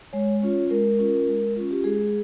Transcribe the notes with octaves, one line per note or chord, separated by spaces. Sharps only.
G#3 C#5
C#4 F4 C#5
G#3 A#4
C#4 F4
G#3
C#4 F4
G4
G#3 G#4